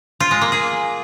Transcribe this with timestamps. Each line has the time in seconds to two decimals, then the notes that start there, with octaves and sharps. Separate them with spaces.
0.20 F4
0.31 G#3
0.41 A#3
0.52 G#4